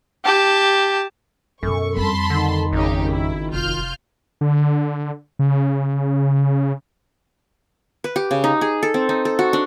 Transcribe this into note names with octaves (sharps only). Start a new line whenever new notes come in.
G4 A5
F#2 B2 F#3 A4 C#6
F2 G3 A5 B5 C6
D3 D#3
G#1 C#3 D#4 G4
E4
F1 F4 F6 G6
D3
C#3
B4
G4
C#3
D#4
G#4
A4
C4
D#4
A4
F#4
D4